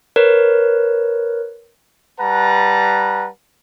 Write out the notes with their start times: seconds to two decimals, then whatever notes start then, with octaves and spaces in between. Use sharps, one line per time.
0.16 A#4 B4 C#5
2.20 G3 B4 F#5 A5 A#5